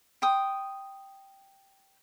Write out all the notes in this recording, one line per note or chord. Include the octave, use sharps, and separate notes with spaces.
G5 C6 D#6